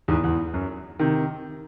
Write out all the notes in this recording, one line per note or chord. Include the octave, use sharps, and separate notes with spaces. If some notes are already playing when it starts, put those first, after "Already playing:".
E2 G#2
E2
F#2
C3 D#3